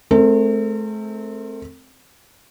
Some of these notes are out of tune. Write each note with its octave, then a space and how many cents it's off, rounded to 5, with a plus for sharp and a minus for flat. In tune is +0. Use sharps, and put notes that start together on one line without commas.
A3 -35 C4 +0 A#4 -45